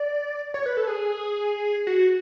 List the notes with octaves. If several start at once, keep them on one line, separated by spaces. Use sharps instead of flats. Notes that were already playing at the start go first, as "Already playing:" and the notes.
Already playing: D5
C#5
B4
A4
G#4
F#4